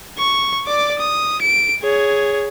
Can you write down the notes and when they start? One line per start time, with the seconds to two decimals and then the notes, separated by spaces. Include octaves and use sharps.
0.18 C#6
0.67 D5 D6
0.99 D#6
1.42 D7
1.83 G#4 C#5